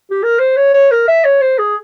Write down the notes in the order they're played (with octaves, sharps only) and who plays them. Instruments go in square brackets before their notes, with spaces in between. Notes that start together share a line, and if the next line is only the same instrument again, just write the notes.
[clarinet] G4
A#4
C5
C#5
C#5
A#4
E5
C#5
C5
G#4